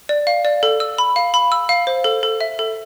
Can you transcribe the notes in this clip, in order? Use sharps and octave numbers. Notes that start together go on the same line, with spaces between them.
D5
F5
D5
A4
E6
B5
F5
B5
E6
F5
C5
A4
A4
E5
A4